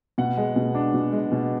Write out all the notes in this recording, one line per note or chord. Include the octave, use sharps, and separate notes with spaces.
B2 F#5
G#3
B2
D4
B2
G#3
B2